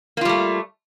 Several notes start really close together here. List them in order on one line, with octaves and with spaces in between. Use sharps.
A#3 F4 G3 A3